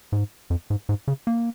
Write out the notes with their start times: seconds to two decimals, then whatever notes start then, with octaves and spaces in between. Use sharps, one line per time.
0.12 G#2
0.50 F2
0.70 G#2
0.89 G#2
1.08 C#3
1.27 A#3